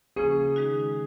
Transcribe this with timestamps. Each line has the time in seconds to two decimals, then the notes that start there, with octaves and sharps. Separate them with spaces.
0.16 C#3 F3 A#3 C#4 G#4
0.56 D#3 G#3 D#4 F#4